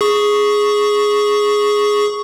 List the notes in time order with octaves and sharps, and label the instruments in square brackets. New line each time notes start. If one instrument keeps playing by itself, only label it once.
[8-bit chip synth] G#4 C#6